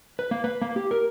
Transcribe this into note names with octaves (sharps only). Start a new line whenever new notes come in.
B4
A#3
B4
A#3
G4
A#4